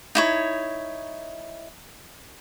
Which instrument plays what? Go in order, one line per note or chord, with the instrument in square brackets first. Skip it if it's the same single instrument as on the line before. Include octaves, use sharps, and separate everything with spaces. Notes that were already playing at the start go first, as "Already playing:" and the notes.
[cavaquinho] D#4 E4 C#5